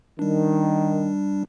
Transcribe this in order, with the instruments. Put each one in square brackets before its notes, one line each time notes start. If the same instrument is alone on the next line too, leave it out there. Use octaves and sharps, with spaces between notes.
[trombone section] D#3 [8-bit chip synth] G3 D4